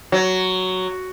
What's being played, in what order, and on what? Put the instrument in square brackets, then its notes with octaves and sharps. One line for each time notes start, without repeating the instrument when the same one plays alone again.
[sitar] F#3